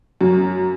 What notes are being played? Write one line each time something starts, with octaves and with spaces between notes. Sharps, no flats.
F#2